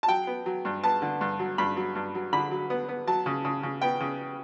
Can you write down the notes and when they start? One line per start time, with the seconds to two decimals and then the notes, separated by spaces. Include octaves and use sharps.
0.03 A5
0.08 F#3 G5
0.27 B3
0.46 F#3
0.65 G2
0.83 B3 A5
1.02 D3
1.21 G2
1.39 F#3
1.58 G2 B5
1.77 F#3
1.95 G2
2.15 F#3
2.33 D3 B5
2.51 F#3
2.70 B3
2.89 B3
3.07 F#3 A5
3.26 C#3
3.45 C#3
3.63 C#3
3.81 B3 G5
4.00 C#3